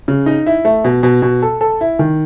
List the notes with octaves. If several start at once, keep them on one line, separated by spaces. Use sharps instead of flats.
C#3
D#4
E4
A3
B2
B2
B2
A4
A4
E4
D#3